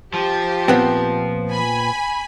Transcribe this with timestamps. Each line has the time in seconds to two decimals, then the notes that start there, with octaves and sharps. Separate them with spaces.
0.14 F3 G4
0.68 A#2 B3 C4
1.51 G#5 B5